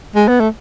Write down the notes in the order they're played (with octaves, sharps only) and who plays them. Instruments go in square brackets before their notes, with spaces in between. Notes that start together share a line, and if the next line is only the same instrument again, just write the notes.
[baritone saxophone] G#3
B3
A3